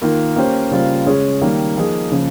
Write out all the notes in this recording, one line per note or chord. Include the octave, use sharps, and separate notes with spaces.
D#3 A#3 F4 A#4
A#3 C#4 G4 C5
C#3 G3 A#3 F4 C5
C#3 G#3 C#4 G#4 C#5
D#3 G3 A#3
F3 A#3 D#4 G#4
C#3 F3 A#3